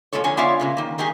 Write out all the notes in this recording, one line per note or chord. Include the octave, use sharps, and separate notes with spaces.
A#2 F3 G#3 F4 A4 C#5
F2 D3 C#5 G#5
B3 F4 C#5 D5 E5 F5
A#2 C#3 G#3
D#3 A#3
G#2 D#3 D#4 G4 G#4 G#5